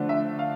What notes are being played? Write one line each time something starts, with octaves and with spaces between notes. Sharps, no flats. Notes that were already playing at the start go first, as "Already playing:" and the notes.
Already playing: D3 F3 A3 D4
E5
F5